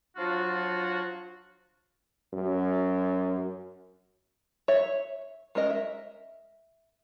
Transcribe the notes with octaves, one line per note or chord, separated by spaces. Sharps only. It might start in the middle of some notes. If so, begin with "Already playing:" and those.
F3 F#3 D4 F4 F#4
F#2
C#5 E5
G#3 C#4 A#4 D#5
E5